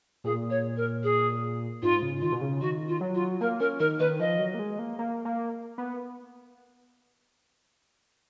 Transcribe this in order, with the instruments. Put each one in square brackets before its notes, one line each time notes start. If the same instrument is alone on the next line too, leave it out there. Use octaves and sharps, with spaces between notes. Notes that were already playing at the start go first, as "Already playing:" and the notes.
[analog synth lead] A#2 [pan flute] G#4
[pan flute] C#5
A#4
G#4
[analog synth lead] G#2 [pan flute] F4
[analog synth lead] C#3
[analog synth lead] D#3 [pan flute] F4
[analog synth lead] B2
C#3
[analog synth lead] D#3 [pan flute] F#4
[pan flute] F4
[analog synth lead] F#3
[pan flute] F4
[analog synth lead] A#3 [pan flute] A#4
[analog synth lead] C#4 [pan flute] A#4
[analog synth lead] D#3 [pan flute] A#4
[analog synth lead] D#3 [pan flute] B4
[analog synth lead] F3 [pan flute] D#5
[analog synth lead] F#3
A#3
G#3
A#3
A#3
A#3
B3